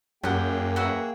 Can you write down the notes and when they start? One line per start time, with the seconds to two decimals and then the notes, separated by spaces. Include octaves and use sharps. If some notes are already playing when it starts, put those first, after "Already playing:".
0.23 F#2 A#3 G4 G#4 F#5 G5
0.76 F#4 B4 E5